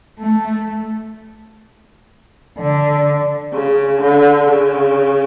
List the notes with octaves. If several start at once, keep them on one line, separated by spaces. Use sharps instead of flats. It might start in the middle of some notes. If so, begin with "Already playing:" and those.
A3
D3
C#3
D3
C#3